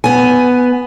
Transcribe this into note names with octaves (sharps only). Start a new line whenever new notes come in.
B3 G#5